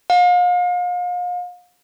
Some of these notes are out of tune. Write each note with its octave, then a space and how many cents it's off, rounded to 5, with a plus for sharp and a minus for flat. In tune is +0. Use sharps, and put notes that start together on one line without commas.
F5 +40